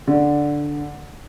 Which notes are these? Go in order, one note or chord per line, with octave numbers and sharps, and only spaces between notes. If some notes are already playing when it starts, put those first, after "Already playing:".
D3